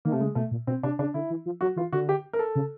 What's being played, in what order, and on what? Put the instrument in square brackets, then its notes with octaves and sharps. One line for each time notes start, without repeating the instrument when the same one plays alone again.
[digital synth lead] D#3 [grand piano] A#3
[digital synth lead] C3 [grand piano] A3
[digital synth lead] C#3 [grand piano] G#3
[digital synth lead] B2 [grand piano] A3
[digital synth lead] A#2
[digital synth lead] B2 [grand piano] C4
[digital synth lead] C3 [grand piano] D4
[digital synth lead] C#3 [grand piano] D4
[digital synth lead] D3 [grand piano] E4
[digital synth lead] E3
F3
[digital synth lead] F#3 [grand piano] F#4
[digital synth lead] E3 [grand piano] F4
[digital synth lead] D3 [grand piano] F#4
[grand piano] G4
A#4
A4
[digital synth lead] C#3